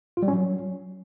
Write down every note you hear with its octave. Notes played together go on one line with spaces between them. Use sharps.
F4
G3
C#4
F#3